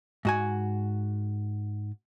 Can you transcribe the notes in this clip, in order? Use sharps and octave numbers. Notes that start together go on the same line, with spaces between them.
G#2 F#4 G#5